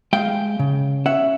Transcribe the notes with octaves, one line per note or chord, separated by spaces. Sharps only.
G#3 F5 G5
C#3
C#4 E5 F#5